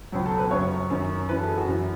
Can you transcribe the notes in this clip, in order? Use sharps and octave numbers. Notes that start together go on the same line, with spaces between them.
C#2 B2 F#3
A4
B4
F#2 C#3 F#3 C#5
F#2 D#3 F#3
F#2 E3 B4
A4
G#4
F#4
F#2 E3